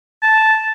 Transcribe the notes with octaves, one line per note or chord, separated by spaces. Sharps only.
A5